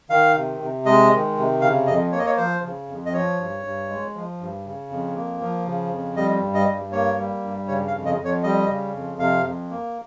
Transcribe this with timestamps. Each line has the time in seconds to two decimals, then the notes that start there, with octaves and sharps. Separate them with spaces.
0.10 D#3 F5
0.35 C3
0.60 C3
0.86 G#3 D#5
1.11 D#3
1.36 C3
1.61 C#3 F5
1.86 F2 D#5
2.12 A#3 C#5
2.19 D#5
2.26 C#5
2.37 F3 C5
2.62 C#3
2.88 F2
3.06 D#5
3.13 F3 C#5
3.38 G2
3.64 G2
3.89 G#3
4.14 F3
4.39 G2
4.65 C#3
4.89 F2
5.15 A#3
5.40 F3
5.66 C#3
5.91 F2
6.16 G3 D#5
6.41 G2
6.54 D#5
6.67 G2
6.92 A#3 C#5
7.17 G3
7.43 G2
7.68 C#3 C#5
7.87 F5
7.93 F2
8.05 D#5
8.18 F2
8.24 C#5
8.43 G3 D#5
8.68 C#3
8.94 F2
9.19 C3 F5
9.45 F2
9.70 A#3